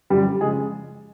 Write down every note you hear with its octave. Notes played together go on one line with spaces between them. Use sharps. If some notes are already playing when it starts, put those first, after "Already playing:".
F#2 D3 F3 G3 G4
C#3 F3 G#3 G#4